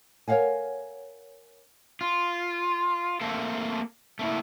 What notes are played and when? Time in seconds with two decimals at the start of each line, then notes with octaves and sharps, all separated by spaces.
0.28 A#4 C#5 D#5 F5 F#5 G#5
2.01 F4
3.21 A3 A#3 C4 A4 A#4 F5
4.19 A3 A#3 E4